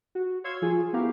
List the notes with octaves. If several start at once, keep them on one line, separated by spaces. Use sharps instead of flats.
F#4
C#5 F5 C6 E6 G#6
F3 F4 G#4
B3 E4 F#4 G4 A#4 F5